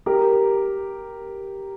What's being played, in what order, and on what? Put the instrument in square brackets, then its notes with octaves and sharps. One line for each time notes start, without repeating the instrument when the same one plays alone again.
[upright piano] G4 A#4